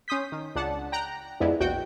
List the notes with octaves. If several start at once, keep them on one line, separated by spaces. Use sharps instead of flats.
C#4 C6 D#6 G6 B6
D#3
C#2 D4 F#5 A5
G5 A#5 F#6
F2 G#3 B3 D4 E4
A#1 E2 F#4 G5 G6